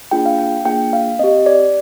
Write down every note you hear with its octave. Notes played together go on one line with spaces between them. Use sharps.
A#3 D4 F4 G#4 G5
F5
G5
A#3 D4 F4 G#4 G5
F5
C4 G4 D#5
D5